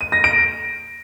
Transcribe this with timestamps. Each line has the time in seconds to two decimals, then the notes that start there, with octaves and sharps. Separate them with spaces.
0.01 D#7
0.12 A#6
0.24 D7